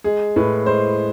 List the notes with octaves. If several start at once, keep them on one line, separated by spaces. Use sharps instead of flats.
G#3 G#4
A2 B4
G#3 C5